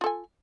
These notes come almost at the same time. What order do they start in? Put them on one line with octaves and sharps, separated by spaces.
F4 A4 G#5